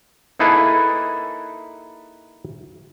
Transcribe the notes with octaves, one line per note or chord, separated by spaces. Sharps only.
A#3 D#4 E4 G#4 A4 B4